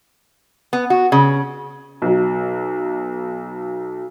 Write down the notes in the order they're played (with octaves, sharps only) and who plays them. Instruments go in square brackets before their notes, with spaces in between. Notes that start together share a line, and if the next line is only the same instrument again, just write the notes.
[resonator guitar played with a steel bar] B3
F#4
C#3
[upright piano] B1 F#3